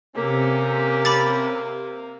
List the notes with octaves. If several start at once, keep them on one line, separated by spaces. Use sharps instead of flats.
C3 A#3 C#4 G4 A4
B5 D6 A6